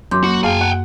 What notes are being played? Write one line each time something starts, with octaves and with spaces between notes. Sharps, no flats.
F#2 C6 D6 G6
A#3 F#4
F#2 G#4 F5 G5 G#5
F#5